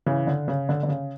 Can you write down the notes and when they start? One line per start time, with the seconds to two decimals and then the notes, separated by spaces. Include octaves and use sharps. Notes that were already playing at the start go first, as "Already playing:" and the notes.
0.06 C#3 E3
0.27 D3
0.48 C#3
0.69 D3
0.83 D3
0.89 C#3